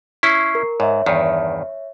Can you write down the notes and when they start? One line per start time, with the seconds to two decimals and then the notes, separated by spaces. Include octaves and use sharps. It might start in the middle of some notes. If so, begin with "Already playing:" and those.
0.23 C#4 E4 C#6 C7
0.55 A#4
0.80 G#2 C#5 E5
1.06 E2 G2 D#3